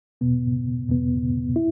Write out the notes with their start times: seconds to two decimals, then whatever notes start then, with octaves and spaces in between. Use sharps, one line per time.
0.21 E2 B2 B3
0.89 E2 B2 B3
1.56 E4